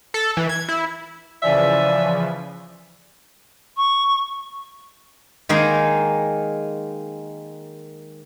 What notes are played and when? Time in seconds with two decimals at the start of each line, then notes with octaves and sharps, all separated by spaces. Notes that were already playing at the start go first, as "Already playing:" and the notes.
0.14 A4
0.37 E3
0.49 G#6
0.68 E4
1.42 C#3 E3 F3 D5 E5 G#5
3.76 C#6
5.49 D#3 G#3 A#3 D#4